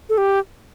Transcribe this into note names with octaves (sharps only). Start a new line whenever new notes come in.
A4
G4